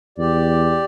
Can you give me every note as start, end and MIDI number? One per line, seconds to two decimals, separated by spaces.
0.18 0.81 40
0.18 0.85 67
0.18 0.85 74